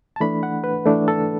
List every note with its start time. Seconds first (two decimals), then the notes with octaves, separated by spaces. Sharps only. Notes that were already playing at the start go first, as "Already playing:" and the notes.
0.16 A5
0.20 E3 A3 D4 B5
0.43 F#5
0.64 B4
0.85 E3 A3 D4 A4
1.08 A4